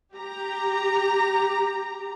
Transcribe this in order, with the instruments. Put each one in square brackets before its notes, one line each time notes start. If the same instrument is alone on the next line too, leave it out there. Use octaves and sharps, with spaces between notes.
[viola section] G4 A#5